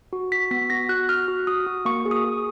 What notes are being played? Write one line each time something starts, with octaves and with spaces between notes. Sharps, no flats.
F#4
F#4 B6
B3 B6
F#4 A#6
F#4 F#6
F#4 F6
F#4
F#4 D#6
F#4
A#3 C#6
G#4
D#6
G#4